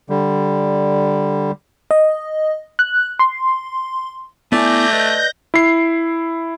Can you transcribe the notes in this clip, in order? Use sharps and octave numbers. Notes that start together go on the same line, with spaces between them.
D3 G3
D#5
F#6
C6
A3 B3 E4 D5 G#5 G6 A#6
B4 D5 D#5 F#6
E4 C7